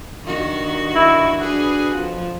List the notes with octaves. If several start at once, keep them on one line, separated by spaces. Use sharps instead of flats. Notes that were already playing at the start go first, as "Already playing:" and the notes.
G2 D#3 F#4
E4
D4 F#4 G#4 B4
F2 F3